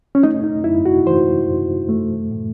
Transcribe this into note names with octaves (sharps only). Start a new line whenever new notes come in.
C#4
A3 D#4
D#4
F#2 E4
F#4
E3 C5
F#2
A3
A2